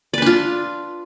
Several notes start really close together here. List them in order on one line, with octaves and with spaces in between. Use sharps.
D5 B4 D4 F4